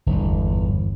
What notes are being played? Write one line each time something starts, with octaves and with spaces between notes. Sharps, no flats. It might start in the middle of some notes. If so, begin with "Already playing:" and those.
G1 E2